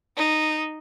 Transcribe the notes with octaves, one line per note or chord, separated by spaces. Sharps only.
D#4